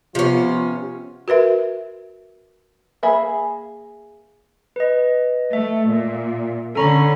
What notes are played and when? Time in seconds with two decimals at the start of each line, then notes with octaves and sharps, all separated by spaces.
0.15 C3 F3 B3 C#4 F4
1.28 F#4 A#4 B4 E5
3.03 A#3 G#4 E5 B5
4.76 B4 D#5
5.53 A3 E5
5.89 A#2
6.75 D3 C#4 A4 A#5 B5